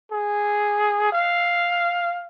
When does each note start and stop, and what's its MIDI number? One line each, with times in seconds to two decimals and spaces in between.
0.12 1.12 68
1.13 2.26 77